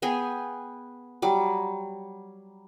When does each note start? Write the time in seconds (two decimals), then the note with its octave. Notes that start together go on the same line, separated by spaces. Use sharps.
0.02 B3 G#4 G5 G#5
1.22 F#3 G3 D6